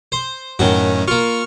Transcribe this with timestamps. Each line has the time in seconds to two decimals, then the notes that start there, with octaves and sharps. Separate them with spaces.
0.12 C5
0.59 F#2 A2 D#3 C#4 F#4
1.08 A#3 F4 C#6 F6